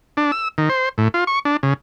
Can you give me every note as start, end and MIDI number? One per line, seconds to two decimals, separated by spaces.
0.17 0.31 62
0.32 0.48 88
0.58 0.69 51
0.69 0.89 72
0.98 1.08 45
1.14 1.24 65
1.27 1.39 85
1.45 1.57 62
1.63 1.74 49